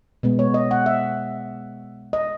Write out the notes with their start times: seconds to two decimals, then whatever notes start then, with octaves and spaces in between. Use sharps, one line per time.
0.23 B2 G#3 B3
0.39 C#5
0.54 D#5
0.71 F#5
0.86 E5
2.13 D#5